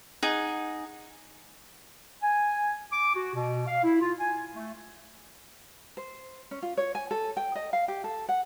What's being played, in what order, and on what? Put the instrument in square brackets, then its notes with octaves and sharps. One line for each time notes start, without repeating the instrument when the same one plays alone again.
[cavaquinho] D#4 G#4 F#5
[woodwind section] G#5
D6
F#4
B2
F5
E4
F4
G#5
A3
[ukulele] C5
C#4
F4
C#5
G#5
A4
G5
D#5
F5
G4
A4
F#5